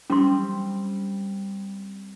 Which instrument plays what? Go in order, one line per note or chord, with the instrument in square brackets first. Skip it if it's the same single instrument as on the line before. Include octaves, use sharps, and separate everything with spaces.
[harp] G3 C4 [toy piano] C#4 C6